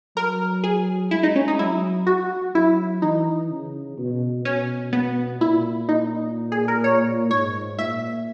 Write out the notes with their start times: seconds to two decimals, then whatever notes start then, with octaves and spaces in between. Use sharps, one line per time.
0.16 F#3 A#4
0.64 G#4
1.11 G#3 E4
1.23 D#4
1.36 C#4
1.48 D#4
1.59 F#3 E4
2.07 F#4
2.54 F#3 E4
3.02 E3 D#4
3.50 C#3
3.98 B2
4.45 B2 C#4
4.93 B3
5.40 A#2 E4
5.89 D#4
6.52 G#4
6.68 A#4
6.84 C#5
7.31 G#2 C#5
7.78 A#2 E5